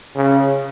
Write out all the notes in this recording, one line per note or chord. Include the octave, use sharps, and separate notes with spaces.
C#3